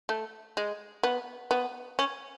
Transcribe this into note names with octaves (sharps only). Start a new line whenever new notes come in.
A3
G#3
B3
B3
C#4